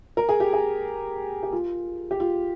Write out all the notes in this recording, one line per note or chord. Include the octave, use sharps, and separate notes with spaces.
A#4
G#4
G4
G#4
G4
F4
G4
F4